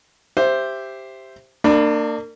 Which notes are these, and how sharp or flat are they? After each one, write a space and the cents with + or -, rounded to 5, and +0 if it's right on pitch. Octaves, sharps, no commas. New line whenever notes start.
G4 +0 C5 +0 E5 +10
A#3 -30 D4 +25 B5 +0